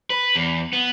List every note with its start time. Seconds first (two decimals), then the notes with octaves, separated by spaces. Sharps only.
0.10 B4
0.35 E2
0.73 B3